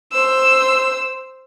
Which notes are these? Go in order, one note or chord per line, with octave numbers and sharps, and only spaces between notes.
C5 E6